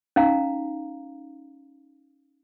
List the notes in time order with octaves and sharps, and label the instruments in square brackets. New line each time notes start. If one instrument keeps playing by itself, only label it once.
[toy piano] C#4 D#4 F5 A#5